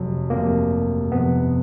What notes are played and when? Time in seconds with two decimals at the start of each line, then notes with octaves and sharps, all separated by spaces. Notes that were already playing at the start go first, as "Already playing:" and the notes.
Already playing: F1 F2 C3 F#3
0.30 F1 F2 C3 A#3
1.11 F1 F2 C3 B3